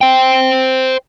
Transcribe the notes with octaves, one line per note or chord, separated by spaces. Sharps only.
C5 G5